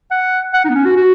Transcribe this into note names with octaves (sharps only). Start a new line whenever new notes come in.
F#5
F#5
D#4
B3
C#4
F#4
F#4